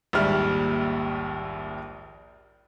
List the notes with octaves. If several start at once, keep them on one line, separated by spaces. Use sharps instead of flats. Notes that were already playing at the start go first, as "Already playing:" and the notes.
A#1 D#2 G#2 G3 E5 F6